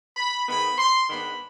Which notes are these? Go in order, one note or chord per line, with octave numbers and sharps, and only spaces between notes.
B5
G#2 D#3 B3 B5
C6
G#2 D#3 B3 D4 B5